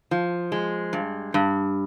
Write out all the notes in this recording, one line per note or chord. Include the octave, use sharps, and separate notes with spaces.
F3
G#3
G2
G2